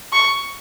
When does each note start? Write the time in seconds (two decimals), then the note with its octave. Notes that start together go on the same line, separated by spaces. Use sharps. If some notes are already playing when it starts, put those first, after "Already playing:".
0.13 C#6